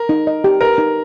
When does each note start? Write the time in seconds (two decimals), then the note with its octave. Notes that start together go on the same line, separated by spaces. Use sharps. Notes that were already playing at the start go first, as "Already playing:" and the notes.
Already playing: A#4
0.09 D#4
0.27 D#5
0.44 G4
0.61 A#4 B4
0.78 D#4